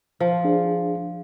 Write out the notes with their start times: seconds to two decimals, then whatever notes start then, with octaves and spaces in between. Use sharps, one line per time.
0.20 F3
0.45 D4 G#4